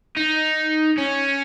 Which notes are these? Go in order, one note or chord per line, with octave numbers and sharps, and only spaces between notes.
D#4
C#4